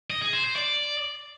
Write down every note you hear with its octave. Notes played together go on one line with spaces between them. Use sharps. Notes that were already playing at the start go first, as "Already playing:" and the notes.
D#5
G#4
C5
C5
D5